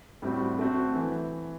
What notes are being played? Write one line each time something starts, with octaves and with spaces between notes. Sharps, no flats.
A2 G3 C4 F#4
A3 C4 F#4
E3